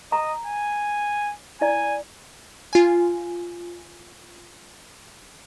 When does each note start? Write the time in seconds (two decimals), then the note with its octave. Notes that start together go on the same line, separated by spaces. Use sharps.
0.12 D#5 A#5
0.45 G#5
1.61 E4 D5 G#5 A#5
2.73 F4 G#5